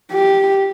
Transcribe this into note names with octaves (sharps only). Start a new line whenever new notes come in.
G4